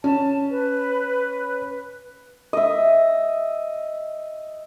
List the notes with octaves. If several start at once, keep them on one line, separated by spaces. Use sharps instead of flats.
C#4 A5
B4
D#5 E5